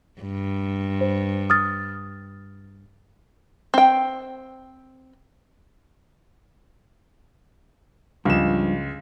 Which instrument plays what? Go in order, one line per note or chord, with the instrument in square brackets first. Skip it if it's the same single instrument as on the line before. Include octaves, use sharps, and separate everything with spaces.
[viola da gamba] G2
[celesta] C5
D#6 F6 A6
[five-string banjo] C4 G5
[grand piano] C#2 E7 [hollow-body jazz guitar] G2 F3